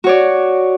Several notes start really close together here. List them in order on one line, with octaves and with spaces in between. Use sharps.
F#4 C#5 D5